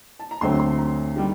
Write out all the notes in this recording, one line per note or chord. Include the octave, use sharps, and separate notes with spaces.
A5
A#5
D2 D3 F#3 C4 C6
C6
A#5
D#3 G3